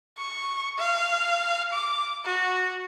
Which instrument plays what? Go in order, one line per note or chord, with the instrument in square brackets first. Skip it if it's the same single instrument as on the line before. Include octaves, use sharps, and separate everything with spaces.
[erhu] C#6
F5
D6
F#4